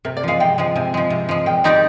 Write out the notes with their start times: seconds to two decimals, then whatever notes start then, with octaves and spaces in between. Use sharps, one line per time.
0.05 C3 A#4
0.17 D5
0.23 F3 G#3 F5
0.40 C3 G5
0.58 F3 G#3
0.76 C3 G#5
0.94 F3 G#3
1.10 C3
1.29 F3 G#3
1.46 A#2 G5
1.64 G#3 D#4 G4 D5